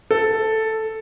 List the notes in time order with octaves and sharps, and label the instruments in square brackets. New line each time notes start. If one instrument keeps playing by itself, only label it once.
[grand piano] A4